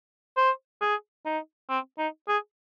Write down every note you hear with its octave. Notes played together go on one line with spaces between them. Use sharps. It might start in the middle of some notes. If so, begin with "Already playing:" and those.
C5
G#4
D#4
C4
D#4
G#4